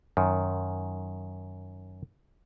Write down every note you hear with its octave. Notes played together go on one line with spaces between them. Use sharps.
F#2 D#3